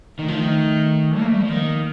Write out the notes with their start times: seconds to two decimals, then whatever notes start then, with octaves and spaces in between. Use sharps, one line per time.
0.19 D#3 A3
0.28 F3
0.38 D#3
1.19 A#3
1.27 A3
1.34 G3
1.42 F3
1.49 D#3 A#3